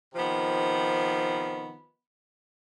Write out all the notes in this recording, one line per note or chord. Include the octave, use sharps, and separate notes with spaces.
C3 D#3 F3 B3